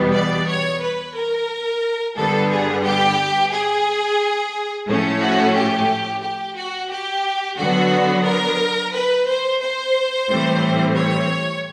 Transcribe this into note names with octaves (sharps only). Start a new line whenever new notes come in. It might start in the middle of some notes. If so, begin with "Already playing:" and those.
Already playing: E2 B2 G3 B3
D5
C#5
B4
A#4
G2 D3 G3 B3 A4
G#4
G4
G#4
A2 F3 A3 C#4
F#4
G4
G4
F#4
G4
D3 F#3 B3 F#4
A#4
B4
C5
C5
A2 E3 G3 C4
C#5